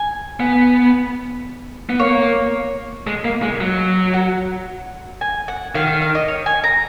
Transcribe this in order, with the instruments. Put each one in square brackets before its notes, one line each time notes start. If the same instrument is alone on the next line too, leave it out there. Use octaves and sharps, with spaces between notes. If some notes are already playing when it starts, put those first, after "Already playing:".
Already playing: [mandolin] G#5
[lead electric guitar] B3
B3
[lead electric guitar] A#3 [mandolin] C#5
[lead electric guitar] G#3 [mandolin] D#5
[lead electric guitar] A#3
G#3
F#3
[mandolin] F#5
G#5
F#5
[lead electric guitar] D#3 [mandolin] F5
[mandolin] F5
F5
D#5
C#5
G#5
A#5